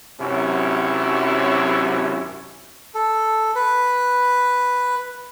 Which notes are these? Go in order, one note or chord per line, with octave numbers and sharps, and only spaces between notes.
G#1 F#2 C3 F#3 C#4 E4
A4
B4